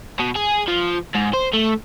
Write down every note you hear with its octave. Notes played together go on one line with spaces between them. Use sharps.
B2
G#4
F3
G#2
C5
A3